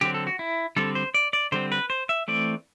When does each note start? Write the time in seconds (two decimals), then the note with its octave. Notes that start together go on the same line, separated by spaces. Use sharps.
0.01 D3 F#3 C4 G4
0.14 A4
0.27 F#4
0.39 E4
0.76 D3 G3 C4 A4
0.95 C5
1.14 D5
1.33 D5
1.52 D3 G3 C4 C5
1.72 B4
1.90 C5
2.09 E5
2.28 E3 A3 C4 D5